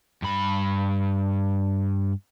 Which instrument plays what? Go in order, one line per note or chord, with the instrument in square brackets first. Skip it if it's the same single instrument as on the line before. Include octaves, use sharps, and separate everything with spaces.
[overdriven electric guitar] G2 B5